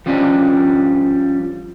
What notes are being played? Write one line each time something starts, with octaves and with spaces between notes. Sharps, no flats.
F3 G3 C#4 D4 D#5